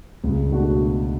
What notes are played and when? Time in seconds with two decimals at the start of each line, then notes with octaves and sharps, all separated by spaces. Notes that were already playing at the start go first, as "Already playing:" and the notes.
0.24 C#2
0.51 B2 A3 D4 F#4